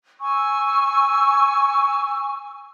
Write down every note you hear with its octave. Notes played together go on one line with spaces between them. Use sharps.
G#5 C#6 E6